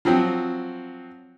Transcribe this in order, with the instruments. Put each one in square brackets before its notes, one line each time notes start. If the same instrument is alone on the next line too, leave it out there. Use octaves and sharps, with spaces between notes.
[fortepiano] F3 F#3 C4